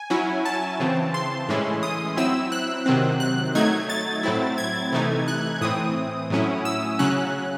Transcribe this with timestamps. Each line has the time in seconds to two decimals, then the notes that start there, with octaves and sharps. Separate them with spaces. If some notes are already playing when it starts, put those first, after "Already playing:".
Already playing: G#5
0.10 F#3 C#4 E4
0.45 A5
0.80 C#3 E3 C4
1.14 C6
1.49 A2 E3 G#3 C#4 E4
1.83 D#6
2.17 F#3 C4 E4 E6
2.52 F#6
2.86 C3 D#3 F#3 C4
3.20 F#6
3.55 F#3 A3 D#4 G#6
3.89 A6
4.23 A2 F#3 C4 E4
4.58 G#6
4.93 C3 E3 A3 D#4
5.28 F#6
5.61 A2 E3 C4 D#6
6.30 A2 F#3 C#4 E4
6.65 E6
6.99 C#3 F#3 C#4 F#6